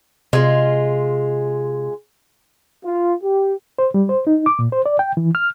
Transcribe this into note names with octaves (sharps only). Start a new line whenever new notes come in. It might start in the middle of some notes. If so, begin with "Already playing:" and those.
C3 G#3 F4
F4
G4
C5
G3
C5
D#4
D6
A#2
C5
D5
G5
E3
F6